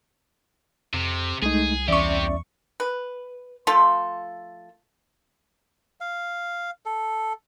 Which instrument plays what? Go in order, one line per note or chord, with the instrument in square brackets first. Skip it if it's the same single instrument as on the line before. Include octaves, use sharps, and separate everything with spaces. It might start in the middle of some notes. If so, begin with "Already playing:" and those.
[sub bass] F2 [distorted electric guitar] C3
[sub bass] C2 [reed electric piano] G#3 A3 D#4 [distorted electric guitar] G#4
[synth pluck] E2 C#6 [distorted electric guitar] C3 G4 [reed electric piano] C#4 D5 E5
[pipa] B4
F3 A3 F4 A4
[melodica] F5
A4